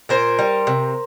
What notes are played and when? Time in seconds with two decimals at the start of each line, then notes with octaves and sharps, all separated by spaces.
0.09 A#2 A#4 C5
0.39 G3
0.67 C3